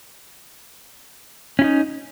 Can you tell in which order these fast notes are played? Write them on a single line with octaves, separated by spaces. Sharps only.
C#4 E4 D#4